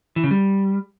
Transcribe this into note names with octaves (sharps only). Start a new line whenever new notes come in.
E3
C#3
G3